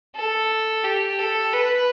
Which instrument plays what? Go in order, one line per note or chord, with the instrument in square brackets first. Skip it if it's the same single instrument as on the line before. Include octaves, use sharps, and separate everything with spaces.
[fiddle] A4
G4
A4
B4